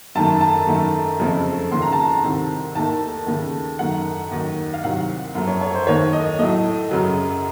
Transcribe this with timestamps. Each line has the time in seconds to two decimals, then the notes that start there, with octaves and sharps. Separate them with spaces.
0.15 F#2 D#3 A3 A5
0.41 A5
0.67 F#2 D#3 A3
1.20 F2 C#3 F3 A3
1.71 D#2 C#3 A3 C6
1.82 A#5
1.92 A5
2.04 A#5
2.23 C2 C3 D#3
2.75 D#2 D#3 A3 A5
3.27 D#2 C#3 A3
3.79 F#2 D#3 A3 F#5
4.31 D#2 D#3 F#3
4.74 F5
4.83 C2 C3 D#3 F#3 F#5
5.35 F#2 F3 A3
5.47 C#5
5.61 C#5
5.75 C5
5.87 D#2 D#3 A3 C#5
6.13 D#5
6.39 A2 F#3 A3 D#5
6.91 F#2 C#3 F#3